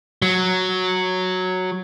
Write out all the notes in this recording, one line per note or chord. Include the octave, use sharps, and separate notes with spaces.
F#3